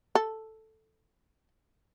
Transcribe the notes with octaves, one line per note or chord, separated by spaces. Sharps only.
A4